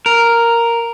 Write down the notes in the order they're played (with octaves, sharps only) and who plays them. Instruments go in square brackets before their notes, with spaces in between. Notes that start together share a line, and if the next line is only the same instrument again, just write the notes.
[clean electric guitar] A#4